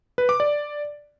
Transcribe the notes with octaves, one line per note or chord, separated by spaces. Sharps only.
B4
D6
D5